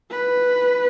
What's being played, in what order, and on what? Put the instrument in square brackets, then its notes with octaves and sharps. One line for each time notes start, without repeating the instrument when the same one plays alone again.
[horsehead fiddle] B4